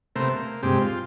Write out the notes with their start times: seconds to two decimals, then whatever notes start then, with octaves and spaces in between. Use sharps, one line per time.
0.16 C3 A3 B3 A#4 C5 E5
0.36 A#3
0.63 G2 C3 G#3 C4 G4
0.81 F4